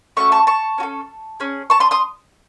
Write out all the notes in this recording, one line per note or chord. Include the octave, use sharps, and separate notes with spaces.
A3 C#4 F#4 A4 C#6
A5 C#6
A5 C#6
C#4 F#4 A4
C#4 G#4
A5 C#6
C6 D#6
C6 D#6